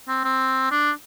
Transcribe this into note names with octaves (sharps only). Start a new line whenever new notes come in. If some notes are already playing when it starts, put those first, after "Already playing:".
C4
C4
D4